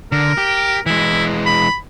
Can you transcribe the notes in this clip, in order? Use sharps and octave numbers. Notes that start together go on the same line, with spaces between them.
D3 A#4
G4
E3 G#3 E4
B5